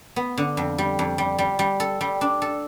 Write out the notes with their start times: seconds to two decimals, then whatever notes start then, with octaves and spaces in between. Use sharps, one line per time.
0.16 B3
0.37 D3
0.57 F2
0.78 G3
0.99 F2
1.18 G3
1.38 G3
1.59 G3
1.80 A4
2.01 G3
2.21 D4
2.42 A4